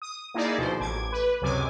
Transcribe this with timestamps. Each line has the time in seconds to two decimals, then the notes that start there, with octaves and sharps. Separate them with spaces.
0.02 D#6
0.34 A#3 D#4 E4 G#4 D5
0.58 D2 B2 F3 C5
0.80 A1 D6 G#6
1.12 B4
1.41 C#2 F#2 C3 G#5 D6